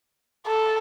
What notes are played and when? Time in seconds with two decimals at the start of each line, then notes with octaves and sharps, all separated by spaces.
0.47 A4